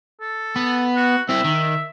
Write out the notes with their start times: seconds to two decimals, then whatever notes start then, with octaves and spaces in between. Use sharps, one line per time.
0.21 A4
0.56 B3
0.96 F#4
1.29 C4 E4 E5
1.44 D#3